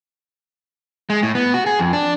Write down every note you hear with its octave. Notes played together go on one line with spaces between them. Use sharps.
G#3
A2
B3
F#4
G#4
F2
D4